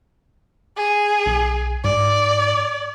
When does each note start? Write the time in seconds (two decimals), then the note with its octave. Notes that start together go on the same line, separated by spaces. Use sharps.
0.77 G#4
1.26 B1
1.84 G#2 D5